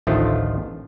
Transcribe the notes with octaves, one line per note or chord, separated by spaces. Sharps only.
A1 D2 D#3 F3 A3 F4